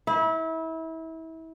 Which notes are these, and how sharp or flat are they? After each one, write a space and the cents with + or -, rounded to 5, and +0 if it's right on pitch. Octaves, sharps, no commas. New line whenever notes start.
E4 -30